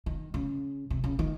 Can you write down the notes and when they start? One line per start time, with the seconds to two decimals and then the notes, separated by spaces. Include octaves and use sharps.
0.06 D#3
0.34 C#3
0.90 C3
1.04 C#3
1.19 D#3